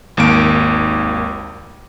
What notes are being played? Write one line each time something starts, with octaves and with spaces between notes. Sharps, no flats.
G#1 D#2 A#3 D7